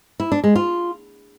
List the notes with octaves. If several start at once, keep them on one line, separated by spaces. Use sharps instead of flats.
E4
D4
G#3
F4